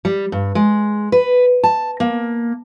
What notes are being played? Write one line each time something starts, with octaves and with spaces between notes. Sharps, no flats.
G3
G2
G#3
B4
A5
A#3